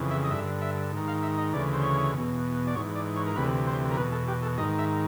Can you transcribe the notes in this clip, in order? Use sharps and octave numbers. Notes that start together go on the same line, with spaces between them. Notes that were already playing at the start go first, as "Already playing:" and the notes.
Already playing: F2 C#3 E3
E5
D#5
G2 D3 E5
E5
G#2 D#3
F5
E5
D#5
D2 C#3 E3 D5
C5
C#5
E2 B2
D5
G#2 E3 C#5
D5
C#5
A#4
D2 C3 E3 B4
C5
A#4
E2 B2 B4
A4
G4
A4
G#2 D#3 D#5
E5